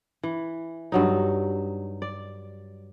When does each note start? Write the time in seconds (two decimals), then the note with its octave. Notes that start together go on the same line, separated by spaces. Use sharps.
0.23 E3
0.92 G2 F#3 D#4
2.02 D5